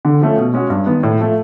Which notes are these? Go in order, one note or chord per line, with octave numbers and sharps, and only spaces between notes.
D3
F3 A3 C#4
B2
G#3 C#4 F#4
G2
D#3 G#3 B3
A2
F3 A3